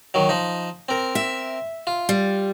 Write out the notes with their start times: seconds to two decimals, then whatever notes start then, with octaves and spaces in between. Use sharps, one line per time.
0.14 D#3 F#3
0.29 F3 D#4
0.89 C4 A#4
1.15 E5
1.87 F4
2.09 G3